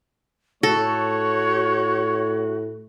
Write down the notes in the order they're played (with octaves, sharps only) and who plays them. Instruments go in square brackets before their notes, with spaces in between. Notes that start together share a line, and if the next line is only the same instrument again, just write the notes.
[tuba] A2 [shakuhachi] F#4 [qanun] A4 [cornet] C#5